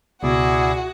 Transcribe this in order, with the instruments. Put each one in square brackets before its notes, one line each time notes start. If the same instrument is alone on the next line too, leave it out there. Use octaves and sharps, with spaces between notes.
[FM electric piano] C#2 B2 [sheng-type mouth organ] E4 G#4 D5 [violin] F#4 F#5